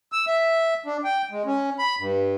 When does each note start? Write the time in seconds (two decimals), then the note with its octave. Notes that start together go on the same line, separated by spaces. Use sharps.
0.12 E6
0.27 E5
0.86 D4
1.04 G5
1.31 G#3
1.46 C#4
1.79 B5
1.99 G2